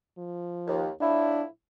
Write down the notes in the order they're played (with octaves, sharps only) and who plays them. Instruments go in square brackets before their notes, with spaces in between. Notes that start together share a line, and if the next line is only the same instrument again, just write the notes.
[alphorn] F3
[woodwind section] D#2
[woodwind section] A2 F3 E4 [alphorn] D4